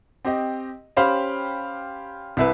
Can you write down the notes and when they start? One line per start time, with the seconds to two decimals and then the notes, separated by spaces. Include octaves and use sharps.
0.25 C4 G4 D#5
0.97 C#4 G4 C5 F5 G5 B5
2.37 C2 E4 B4